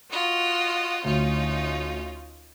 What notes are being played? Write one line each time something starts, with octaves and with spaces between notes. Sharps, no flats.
F4 F#4 D#5
D2 C#4 D#4 F4